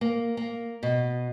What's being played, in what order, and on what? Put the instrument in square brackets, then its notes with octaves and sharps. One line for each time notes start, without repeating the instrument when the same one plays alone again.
[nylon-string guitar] A#3
A#3
B2